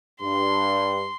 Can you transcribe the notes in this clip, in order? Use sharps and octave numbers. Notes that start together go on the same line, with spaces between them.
G2 C6